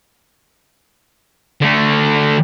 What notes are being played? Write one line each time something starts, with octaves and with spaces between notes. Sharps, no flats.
D3 A3